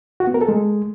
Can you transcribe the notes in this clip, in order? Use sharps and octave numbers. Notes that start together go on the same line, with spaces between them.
F#4
B3
A#4
A4
G#3